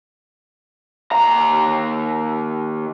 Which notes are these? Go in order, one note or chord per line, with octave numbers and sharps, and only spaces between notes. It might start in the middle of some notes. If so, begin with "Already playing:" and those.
D#2 A#5